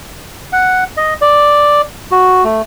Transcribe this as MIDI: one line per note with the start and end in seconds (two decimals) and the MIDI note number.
0.53 0.84 78
0.97 1.14 75
1.21 1.81 74
2.12 2.44 66
2.44 2.62 57